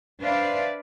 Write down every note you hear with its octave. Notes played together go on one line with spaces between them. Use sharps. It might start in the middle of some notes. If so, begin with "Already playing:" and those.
D4 B4 C5 D5 E5 F5